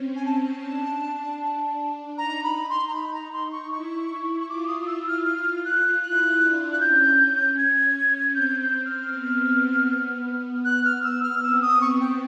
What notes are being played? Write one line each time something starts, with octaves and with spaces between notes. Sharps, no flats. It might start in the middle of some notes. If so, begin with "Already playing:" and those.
Already playing: C4 C#4
G#5
A5
D4
D#4 A#5
B5
C6
A#5
B5
A#5
C6
C#6
E4 C#6
C#6
F4 D6
D#6
D#6
E6
F6
F6
F#6
E4 F#6
D4
F#6
C#4 G6
G#6
C4 G6
G6
F6
B3
F#6
F6
E6
F6
C4 E6
D#6
C#6
G5